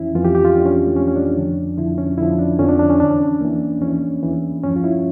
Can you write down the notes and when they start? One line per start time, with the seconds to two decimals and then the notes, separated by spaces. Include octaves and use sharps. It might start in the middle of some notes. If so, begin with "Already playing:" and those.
Already playing: F2 E3 C#4 E4
0.15 F2 E3 F4
0.25 G4
0.35 G4
0.45 F4
0.55 F2 E3 D4
0.65 C#4
0.86 A3
0.96 F2 E3 C#4
1.08 C#4
1.16 D4
1.37 F2 D3 F3
1.77 F2 D3 F3 E4
1.98 C#4
2.18 F2 D3 F3 E4
2.38 D4
2.59 F2 D3 F3 C#4
2.69 D4
2.79 D4
2.90 C#4
3.00 E2 E3 D4
3.20 C#4
3.40 E2 E3 A#3
3.81 E2 E3 C#4
4.23 E2 E3
4.63 G2 F3 C#4
4.76 F4
4.84 E4